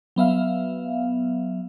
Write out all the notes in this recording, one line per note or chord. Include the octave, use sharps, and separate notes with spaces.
F#3 B3 E5 F5